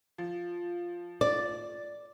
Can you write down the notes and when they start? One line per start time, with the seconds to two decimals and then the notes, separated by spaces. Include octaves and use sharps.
0.18 F3
1.21 D5